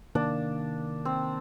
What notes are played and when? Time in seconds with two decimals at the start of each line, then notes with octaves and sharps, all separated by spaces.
0.15 C3 D#3 A#3 D4
1.05 C4